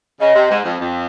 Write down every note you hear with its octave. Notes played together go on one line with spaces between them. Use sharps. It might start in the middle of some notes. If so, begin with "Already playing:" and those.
C#3 D#5
C3
G#2
F2
F2